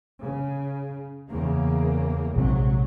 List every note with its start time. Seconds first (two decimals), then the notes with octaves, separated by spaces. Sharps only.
0.22 C#3
1.28 E2 C#3 A#3
2.36 A#1 G#2 C3 F#3 C4